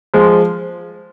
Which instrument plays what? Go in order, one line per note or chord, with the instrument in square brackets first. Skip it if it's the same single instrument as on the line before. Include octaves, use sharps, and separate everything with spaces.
[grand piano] F3 G#3